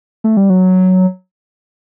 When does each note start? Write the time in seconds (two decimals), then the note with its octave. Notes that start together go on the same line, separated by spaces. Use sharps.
0.24 A3
0.37 G3
0.50 F#3